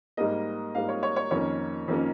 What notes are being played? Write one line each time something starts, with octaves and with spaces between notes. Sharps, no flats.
G#2 G3 A#3 D#5
G#2 G3 A#3 F5
C#5
C#5
C#5
F2 D#3 A#3 C#4 C#5
F2 D#3 A#3 C#4